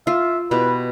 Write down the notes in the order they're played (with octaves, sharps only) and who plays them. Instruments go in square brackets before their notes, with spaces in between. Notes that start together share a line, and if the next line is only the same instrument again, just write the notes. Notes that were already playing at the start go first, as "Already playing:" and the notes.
[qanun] F4 [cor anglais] E5
[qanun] B2 E4 G4 [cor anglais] B4